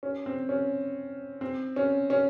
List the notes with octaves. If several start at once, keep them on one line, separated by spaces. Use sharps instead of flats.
C#4
C4
C#4
C4
C#4
C#4